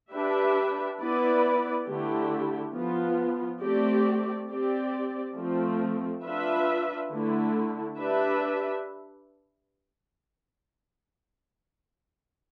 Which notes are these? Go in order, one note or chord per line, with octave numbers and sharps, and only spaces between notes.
D4 G4 B4 E5
B3 E4 B4 D5
D3 A3 E4 G4
F3 B3 F4
A3 C4 G4 D5
C4 G4 D5
F3 A3 C4
D4 F4 B4 E5
D3 A3 E4
D4 G4 B4 E5